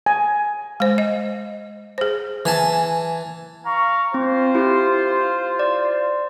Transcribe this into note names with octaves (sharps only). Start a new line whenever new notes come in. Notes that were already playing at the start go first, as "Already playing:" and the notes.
G#5
G#3 C5
D#5
G#4 C5
E3 G#5 A5
F5 A#5 C#6
C4 F4 C5
E4 G4
D5